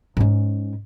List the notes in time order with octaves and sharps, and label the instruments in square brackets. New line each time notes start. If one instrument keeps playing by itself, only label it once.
[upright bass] G#2 C#4